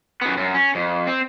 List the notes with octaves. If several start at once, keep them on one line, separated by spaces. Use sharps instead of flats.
F#2 B3
F#2
C#4
F2
C4